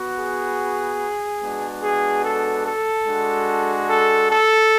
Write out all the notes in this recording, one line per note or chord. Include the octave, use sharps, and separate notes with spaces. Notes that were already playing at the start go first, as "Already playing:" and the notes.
Already playing: B3 F#4
G#4
G#3 B3 D4 F#4
G#4
A4
A4
G#3 D4 F#4
A4
A4